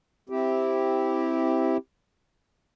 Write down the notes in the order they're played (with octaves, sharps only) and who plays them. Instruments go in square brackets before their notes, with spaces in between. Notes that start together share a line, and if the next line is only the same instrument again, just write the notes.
[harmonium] C4 E4 G4